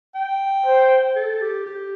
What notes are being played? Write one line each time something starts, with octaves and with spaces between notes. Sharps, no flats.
G5
C5
A4
G4
G4